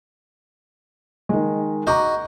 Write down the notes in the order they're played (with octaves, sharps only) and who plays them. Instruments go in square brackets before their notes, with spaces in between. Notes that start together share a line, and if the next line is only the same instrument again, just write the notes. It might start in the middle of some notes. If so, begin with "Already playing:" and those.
[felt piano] D#3 G#3
[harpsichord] F#4 D#5 [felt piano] A#5 D6 G6